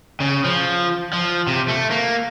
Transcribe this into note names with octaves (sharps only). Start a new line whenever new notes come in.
C#3
F3
F3
C3
A3
A#3